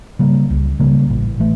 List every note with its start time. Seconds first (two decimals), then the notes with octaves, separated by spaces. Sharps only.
0.19 C#3 G3 A#3
0.50 C#2
0.79 C#3 G3 A#3
1.10 A1
1.40 E3 A3